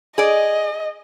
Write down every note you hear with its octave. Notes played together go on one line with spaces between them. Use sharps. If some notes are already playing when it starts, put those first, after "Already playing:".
G#4 D5 D#5